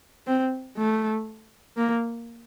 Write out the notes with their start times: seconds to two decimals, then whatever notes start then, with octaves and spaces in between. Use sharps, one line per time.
0.27 C4
0.78 A3
1.77 A#3